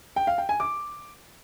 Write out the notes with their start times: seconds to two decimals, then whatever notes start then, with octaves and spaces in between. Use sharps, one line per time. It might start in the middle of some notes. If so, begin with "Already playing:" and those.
0.16 G5
0.27 F5
0.38 G5
0.49 G#5
0.60 D6